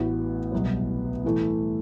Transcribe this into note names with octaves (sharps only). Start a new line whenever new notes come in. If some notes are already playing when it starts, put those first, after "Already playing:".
Already playing: A1 A2 E3 B3 F#4
C2 B2 F#3 B3
A2 E3 A3